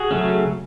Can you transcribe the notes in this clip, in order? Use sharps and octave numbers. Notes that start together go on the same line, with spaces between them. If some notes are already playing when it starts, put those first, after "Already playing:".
Already playing: F#4 G#4
C#3 F#3 A3 C#4